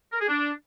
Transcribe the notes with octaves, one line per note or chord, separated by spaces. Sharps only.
A#4
G#4
D4